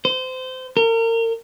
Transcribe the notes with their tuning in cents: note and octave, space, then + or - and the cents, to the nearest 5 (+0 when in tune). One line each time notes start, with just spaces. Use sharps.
C5 -25
A#4 -35